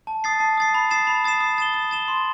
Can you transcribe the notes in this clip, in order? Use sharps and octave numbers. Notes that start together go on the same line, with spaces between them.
A5
D#6 A6 C7
A5
D#6 A6 C7
B5
D#6 A6 C7 E7
B5
D#6 A6 C7 E7
D#6
A6 E7 G7
D#6
A6 E7 G7
C6